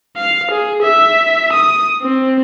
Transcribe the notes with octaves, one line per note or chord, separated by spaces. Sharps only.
F5
G#4
E5
D#6
C4